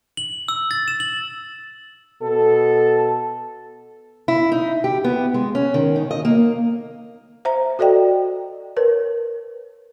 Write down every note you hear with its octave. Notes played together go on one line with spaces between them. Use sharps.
F#7
E6
A6
E7
F#7
B2 A4
E4
D#4
G4
B3
G#3
C#4
D#3
D#4
D#5
A#3
C5 E5 A#5
F#4 A4 D5 D#5 G5
A#4 B4 C#5